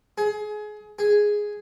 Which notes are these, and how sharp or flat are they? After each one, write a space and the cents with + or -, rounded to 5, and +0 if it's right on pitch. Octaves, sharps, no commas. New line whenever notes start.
G#4 +25
G#4 +0